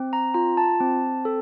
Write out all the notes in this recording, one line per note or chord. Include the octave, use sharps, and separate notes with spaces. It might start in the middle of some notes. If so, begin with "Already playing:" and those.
Already playing: C4
A#5
F4 A#5
A5
C4
A4